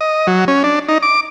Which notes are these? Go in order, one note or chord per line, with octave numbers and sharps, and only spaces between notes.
D#5
F#3
C#4
D4
D#4
D6